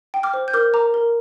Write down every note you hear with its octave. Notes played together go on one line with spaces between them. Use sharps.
G5
D6 F6
C5
G6
A#4 D6 F6
A#4 A#5 D6
A#4